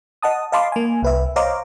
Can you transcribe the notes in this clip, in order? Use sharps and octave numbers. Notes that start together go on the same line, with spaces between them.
D#5 F#5 A5 D#6
D#5 F5 A5 B5 C6 D6
A#3 G#5
C2 B4 E5
C5 C#5 D#5 F5 A#5 D6